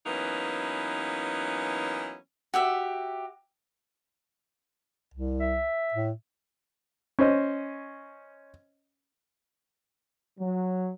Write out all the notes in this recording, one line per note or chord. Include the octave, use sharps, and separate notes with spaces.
E3 F#3 A#3 B3 C#4 D#4
F#4 G4 E5
C2
E5
A2
C#4 C5 D#5
F#3